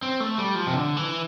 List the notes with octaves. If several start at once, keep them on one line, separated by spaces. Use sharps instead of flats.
C4
A3
G3
F3
C3
D3
E3